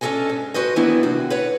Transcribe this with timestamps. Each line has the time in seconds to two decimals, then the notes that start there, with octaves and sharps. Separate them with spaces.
0.01 C#4 D4 F#4 A4 D#5 G#5
0.29 G#2
0.54 F#4 B4 C5 D#5
0.76 D#3 E3 F#3 B3 D4 E4
1.03 D#2 C3 F#4
1.30 B4 C#5 F#5